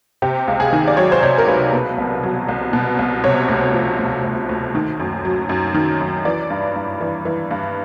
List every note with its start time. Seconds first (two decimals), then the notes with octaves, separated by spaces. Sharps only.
0.22 C3 G4
0.48 C#2
0.60 G#4
0.73 D#3
0.88 D5
0.97 F#3 C#5
1.12 C5
1.23 C3 C#5
1.38 A#4
1.47 C#2 B4
1.73 B2
1.98 C2
2.23 F#3
2.48 C2
2.73 B2
2.99 C2
3.24 C3 C#5
3.49 D2
3.73 F3
3.99 D2
4.24 C3
4.49 D2
4.75 D#3
5.00 F#2
5.25 F#3
5.49 F#2
5.74 D#3
6.01 F#2
6.25 E3 D5
6.50 G2
6.76 G2
7.01 E3
7.25 E3
7.51 G2